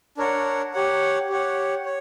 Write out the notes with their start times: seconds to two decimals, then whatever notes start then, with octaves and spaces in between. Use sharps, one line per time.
0.17 D4 A#4 C#5 F#5
0.73 G4 C#5 F#5
1.30 G4 C#5 F#5
1.85 C#5